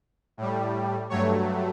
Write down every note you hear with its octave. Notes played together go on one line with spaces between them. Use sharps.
A2 G3
G2 F#3 A3 C#5